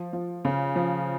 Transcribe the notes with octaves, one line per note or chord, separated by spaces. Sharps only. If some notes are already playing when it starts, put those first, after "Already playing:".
Already playing: F3
F3
C#3
F3